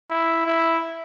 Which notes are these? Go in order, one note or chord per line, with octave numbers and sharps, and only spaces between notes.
E4
E4